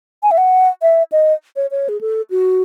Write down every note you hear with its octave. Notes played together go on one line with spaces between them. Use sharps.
G#5
E5
F#5
E5
D#5
C#5
C#5
G#4
A4
F#4